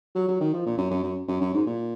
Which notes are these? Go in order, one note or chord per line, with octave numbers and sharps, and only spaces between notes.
F#3
F#3
D#3
F3
A#2
F#2
F#2
F#2
F#2
F#2
G#2
A#2